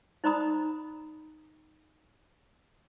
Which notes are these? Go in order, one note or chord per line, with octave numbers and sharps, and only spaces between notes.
D#4 C5 D5 A#5 B5 D#6